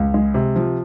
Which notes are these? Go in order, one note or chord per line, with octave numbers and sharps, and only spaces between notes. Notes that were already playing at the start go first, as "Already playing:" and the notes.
Already playing: C#2
G#3
C3
F3